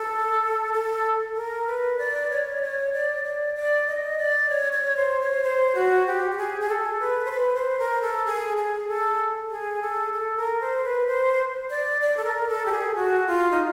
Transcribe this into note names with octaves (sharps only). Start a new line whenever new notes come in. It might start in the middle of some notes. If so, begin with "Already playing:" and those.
Already playing: A4
A4
A#4
B4
D5
C#5
D5
C#5
D5
D5
D5
D#5
D5
C#5
C#5
C5
C#5
C5
F#4
G4
G4
G#4
G#4
A4
B4
C5
B4
C5
A#4
A4
G#4
G#4
A4
G#4
A4
A4
A#4
C5
B4
C5
D5
D5
A4
A#4
A4
G4
G#4
F#4
F4
D#4